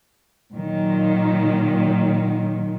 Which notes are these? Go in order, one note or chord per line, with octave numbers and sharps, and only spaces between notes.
A#2 D#3 F#3